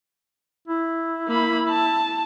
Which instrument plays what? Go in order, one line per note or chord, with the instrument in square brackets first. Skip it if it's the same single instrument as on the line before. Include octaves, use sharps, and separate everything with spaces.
[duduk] E4
[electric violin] A#3 B5
A5